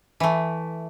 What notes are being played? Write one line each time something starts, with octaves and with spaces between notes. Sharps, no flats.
E3 A3